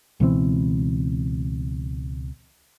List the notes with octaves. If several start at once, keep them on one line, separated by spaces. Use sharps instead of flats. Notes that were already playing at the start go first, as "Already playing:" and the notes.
C#2 B2 E3 C4